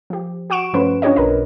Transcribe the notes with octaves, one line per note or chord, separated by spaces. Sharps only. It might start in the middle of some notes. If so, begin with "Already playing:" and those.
F3 G4
F#4 F#5 C#6 D7 E7
G2 F3 A3 C#4 B4 C6
C#4 D4 F4 G4 C#5 D#5
B1 A#4 B4 D#5